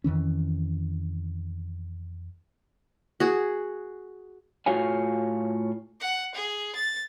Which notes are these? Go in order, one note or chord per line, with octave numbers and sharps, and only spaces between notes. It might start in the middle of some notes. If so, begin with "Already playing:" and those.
F2 D#3 E3 C#4
F#4 G#4
A2 F4 F#4 C#5 F5 G#5
F#5
G#4
A6